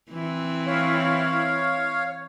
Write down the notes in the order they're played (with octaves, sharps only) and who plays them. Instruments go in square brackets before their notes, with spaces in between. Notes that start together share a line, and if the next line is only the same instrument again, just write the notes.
[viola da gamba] E3 C4 E4
[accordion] C#5 F5